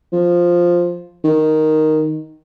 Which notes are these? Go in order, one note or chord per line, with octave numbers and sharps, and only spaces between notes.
F3
D#3